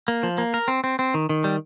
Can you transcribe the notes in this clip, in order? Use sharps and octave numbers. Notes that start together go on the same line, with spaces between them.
A#3
F3
A#3
A#4
C4
C4
C4
D#3
D#3
G3